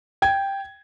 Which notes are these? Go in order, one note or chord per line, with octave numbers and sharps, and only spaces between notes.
G5 G#6